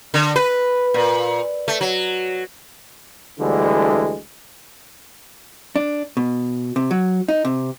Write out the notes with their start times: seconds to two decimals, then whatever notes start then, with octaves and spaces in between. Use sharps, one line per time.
0.14 D3
0.36 B4
0.94 A#2
1.68 A3
1.81 F#3
3.40 D2 D3 E3 G3 G#3
5.76 D4
6.17 B2
6.76 C3
6.91 F#3
7.28 D#4
7.45 C3